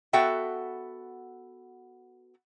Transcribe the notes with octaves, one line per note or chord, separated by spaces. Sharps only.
B3 F#4 A4 E5 G5